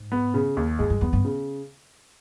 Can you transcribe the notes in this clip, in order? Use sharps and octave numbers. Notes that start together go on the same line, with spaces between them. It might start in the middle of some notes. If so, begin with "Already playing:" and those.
Already playing: G#2
B3
C#3
D#2
G#2 G#3
G2
E2 B3
G2
C#3